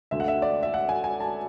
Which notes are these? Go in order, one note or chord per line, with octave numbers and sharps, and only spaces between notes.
D2 D3 E5
F#5
E5
D5
E5
F#5
G#5
G#5
A5